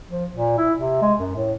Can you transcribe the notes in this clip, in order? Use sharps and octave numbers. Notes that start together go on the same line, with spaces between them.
F3
A#2
E4
C3
G#3
F#2
A2